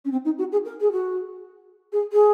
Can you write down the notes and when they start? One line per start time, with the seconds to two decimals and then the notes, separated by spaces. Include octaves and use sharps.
0.05 C#4
0.11 C4
0.25 D#4
0.38 F#4
0.52 G#4
0.65 A#4
0.81 G#4
0.92 F#4
1.92 G#4
2.12 G#4